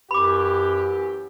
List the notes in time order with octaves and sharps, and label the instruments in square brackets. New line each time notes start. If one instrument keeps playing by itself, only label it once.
[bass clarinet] F#2 [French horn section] E3 F#3 G4 [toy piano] B5 D6